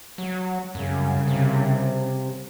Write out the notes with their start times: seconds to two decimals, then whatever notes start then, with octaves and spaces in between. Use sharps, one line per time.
0.18 F#3
0.75 C2 F#2 C#3
1.27 C3